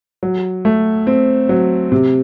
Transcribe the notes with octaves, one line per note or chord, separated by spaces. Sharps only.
F#3
A3
C4
F#3
C3